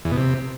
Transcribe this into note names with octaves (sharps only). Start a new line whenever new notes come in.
E2
B2
C3